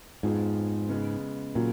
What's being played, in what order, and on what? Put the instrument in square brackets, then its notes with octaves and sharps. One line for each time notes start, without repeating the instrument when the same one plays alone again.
[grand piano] F2 F3 B3 F4 G#4 [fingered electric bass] G#2
[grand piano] C#3 G#3 B3
[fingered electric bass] A#2 [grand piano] C#3 F#3